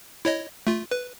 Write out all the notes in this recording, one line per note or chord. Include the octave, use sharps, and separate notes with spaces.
E4 C#5 D#5
A3 F4
B4